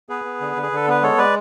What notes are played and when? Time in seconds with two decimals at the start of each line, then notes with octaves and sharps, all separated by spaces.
0.09 B3 G#4 B4
0.25 B3
0.41 D3
0.56 D3
0.62 G#4
0.72 D3 A4
0.87 B3 B4
1.02 G#3 A4 C#5
1.18 G#3 B4 D5